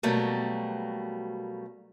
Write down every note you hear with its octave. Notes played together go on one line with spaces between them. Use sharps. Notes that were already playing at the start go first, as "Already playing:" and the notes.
B2 F#3 G3 A3 A#3